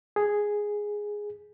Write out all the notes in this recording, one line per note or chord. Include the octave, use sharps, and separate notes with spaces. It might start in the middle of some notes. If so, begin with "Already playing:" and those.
G#4